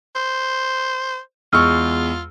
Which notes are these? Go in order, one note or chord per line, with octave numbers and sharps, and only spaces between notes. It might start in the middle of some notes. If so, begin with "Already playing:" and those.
C5
E2 G#3 F4 C#6 E6 F6